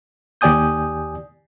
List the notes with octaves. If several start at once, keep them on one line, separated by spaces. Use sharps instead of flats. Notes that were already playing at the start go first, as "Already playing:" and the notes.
D#2 G4 D5 G#5 D#6 G6